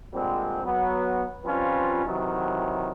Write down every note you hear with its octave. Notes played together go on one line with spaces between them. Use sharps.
A#2 D3 G3 G#3 C4
F#3 B3
F3 G3 C4 C#4 F4 B4
C3 D#3 E3 F#3